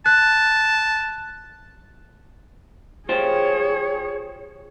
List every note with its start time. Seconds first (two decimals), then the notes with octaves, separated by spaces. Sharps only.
0.06 A5 F#6
3.09 F4 G4 G#4 C5 C#5